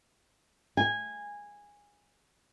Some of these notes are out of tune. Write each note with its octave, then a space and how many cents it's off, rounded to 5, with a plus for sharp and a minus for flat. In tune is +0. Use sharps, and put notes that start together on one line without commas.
G#5 -15